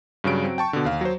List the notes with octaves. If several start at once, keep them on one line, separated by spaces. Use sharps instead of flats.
G2 C#3 F#3 D7
F#3 C4
G5 A5 C#6
B2 D3
D#2 F5
F#3 C5